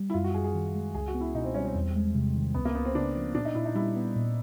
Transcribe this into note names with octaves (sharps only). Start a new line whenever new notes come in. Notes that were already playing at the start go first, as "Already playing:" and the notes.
Already playing: G3
E4
F#2 F4
F#4
F#2 G#4
G#4
D#3
G#3
C#2 G#4
F#4
B3
E4
B2 D#4
C4
G3 C#4
C4
E2
G#3
C3
D#3
C#2 B3
A#3
C#2 B3
C4
C#3 D4
F3
A#2 D4
D#4
A#2 E4
D#4
G3 E4
B3
A#2